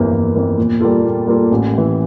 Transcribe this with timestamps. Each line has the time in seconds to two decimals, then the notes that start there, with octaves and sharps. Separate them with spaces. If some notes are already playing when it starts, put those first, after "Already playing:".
Already playing: G1 F2 E3 A#3
0.12 G1
0.35 F2 E3 A#3
0.58 A#2
0.81 G3 A#3 F4 A4
1.04 A#2
1.27 G3 A#3 F4 A4
1.51 A1
1.73 A2 E3